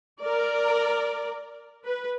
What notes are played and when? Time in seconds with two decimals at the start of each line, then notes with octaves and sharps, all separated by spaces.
0.20 A#4 D5
1.85 B4